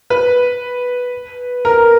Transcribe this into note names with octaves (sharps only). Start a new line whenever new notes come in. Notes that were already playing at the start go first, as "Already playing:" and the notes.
B4
A#4